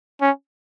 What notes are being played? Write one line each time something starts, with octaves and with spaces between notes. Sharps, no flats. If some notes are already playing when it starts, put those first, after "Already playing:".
C#4